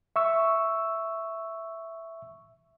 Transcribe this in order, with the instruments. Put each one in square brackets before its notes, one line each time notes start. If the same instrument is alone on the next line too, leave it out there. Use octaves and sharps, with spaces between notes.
[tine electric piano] E5 C#6 E6